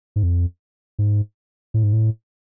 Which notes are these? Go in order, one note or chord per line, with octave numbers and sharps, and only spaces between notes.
G#2
F2
G#2
A2
G#2
A2